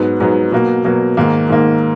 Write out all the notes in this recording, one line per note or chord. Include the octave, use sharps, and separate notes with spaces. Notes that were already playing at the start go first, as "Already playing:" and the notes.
Already playing: G#2 F#3 B3 D#4
G#2 F#3 B3 D#4
B2 F#3 A#3
B2 F#3 A#3
G#2 D#3 A#3
G#2 D#3 A#3